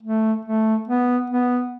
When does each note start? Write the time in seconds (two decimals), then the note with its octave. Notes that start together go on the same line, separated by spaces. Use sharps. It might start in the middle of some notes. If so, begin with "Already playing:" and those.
0.03 A3
0.45 A3
0.87 B3
1.30 B3